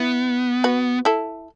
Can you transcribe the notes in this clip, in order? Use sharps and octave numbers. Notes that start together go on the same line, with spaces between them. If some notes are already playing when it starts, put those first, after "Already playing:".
Already playing: B3 E4
F#4 B4
E4 A4